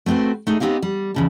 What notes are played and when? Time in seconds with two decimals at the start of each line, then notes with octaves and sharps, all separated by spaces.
0.06 A3 B3 C4 F#4 B4
0.47 A3 D#4 G#4
0.60 B3 C4 D#4 G4 F5
0.82 G3
1.14 E2 C#3 A5